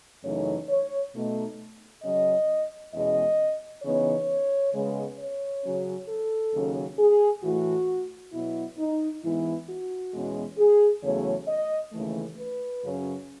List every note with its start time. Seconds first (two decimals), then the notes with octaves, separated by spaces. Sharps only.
0.24 F#2 C#3 E3 A3 D#4 C#5
0.69 C#5
1.14 B2 A3 D#4
2.03 C#3 F#3 C#4 D#5
2.93 E2 B2 G#3 C#4 D#5
3.83 C#3 E3 B3 D#4 C#5
4.74 C#3 G#3 B3
5.19 C#5
5.63 C#3 F#3 C#4
6.08 A4
6.53 D#2 C#3 F#3 C#4
6.98 G#4
7.43 A2 E3 A3 F#4
8.33 B2 F#3 B3 E4
8.78 D#4
9.23 G#2 E3 B3 E4
9.68 F#4
10.14 E2 B2 G#3 C#4
10.58 G#4
11.03 E2 C#3 F#3 A3 C#5
11.48 D#5
11.93 D#2 C#3 E3 A3
12.37 B4
12.82 F#2 C#3 F#3 C#4